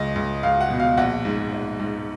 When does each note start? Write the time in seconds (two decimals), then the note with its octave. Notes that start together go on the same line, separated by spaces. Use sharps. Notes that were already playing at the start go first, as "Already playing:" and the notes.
Already playing: C#2 D#5
0.16 C#2
0.43 C#2 F5
0.61 F#5
0.70 B2
0.80 F5
0.97 A#1 F#5
1.25 G#2
1.52 A#1
1.80 G#2